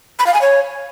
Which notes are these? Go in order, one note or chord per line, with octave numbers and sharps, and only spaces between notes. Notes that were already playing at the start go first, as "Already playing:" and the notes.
B5
F5
G#5
C#5